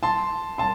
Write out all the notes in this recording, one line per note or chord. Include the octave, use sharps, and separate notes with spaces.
A5 C6
A5 C6